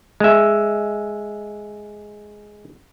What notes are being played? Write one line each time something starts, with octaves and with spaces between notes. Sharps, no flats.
G#3 E5